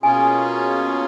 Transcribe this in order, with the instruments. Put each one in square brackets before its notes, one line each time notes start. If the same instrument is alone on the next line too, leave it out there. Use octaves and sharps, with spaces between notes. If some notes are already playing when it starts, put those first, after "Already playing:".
[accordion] B2 A#3 C#4 F4 G#4 [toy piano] G#5